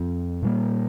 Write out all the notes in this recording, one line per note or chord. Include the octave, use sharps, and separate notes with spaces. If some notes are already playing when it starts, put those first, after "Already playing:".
Already playing: F2 F3 C4
A#2 G3 A#3